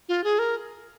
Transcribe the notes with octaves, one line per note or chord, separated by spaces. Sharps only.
F4
G#4
A#4